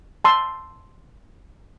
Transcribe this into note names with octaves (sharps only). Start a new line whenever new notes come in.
A5 C6 E6